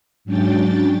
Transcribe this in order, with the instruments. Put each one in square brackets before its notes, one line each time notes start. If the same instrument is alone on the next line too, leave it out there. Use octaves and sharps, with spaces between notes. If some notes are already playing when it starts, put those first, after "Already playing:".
[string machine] G#2 F#3 C#4 D4 G5 A6